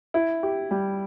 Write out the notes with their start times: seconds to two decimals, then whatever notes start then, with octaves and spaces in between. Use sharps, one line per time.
0.14 E4
0.43 G4
0.71 G3